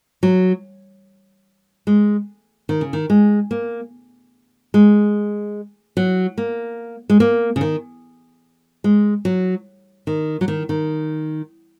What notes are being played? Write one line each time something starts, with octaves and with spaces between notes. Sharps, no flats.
F#3
G#3
D#3
C#3
D#3
G#3
A#3
G#3
F#3
A#3
G#3
A#3
C#3
D#3
G#3
F#3
D#3
F#3
D#3
D#3